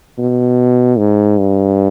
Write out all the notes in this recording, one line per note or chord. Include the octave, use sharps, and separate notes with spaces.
B2
G#2
G2